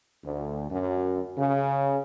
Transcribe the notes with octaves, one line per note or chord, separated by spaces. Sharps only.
D2
F#2
C#3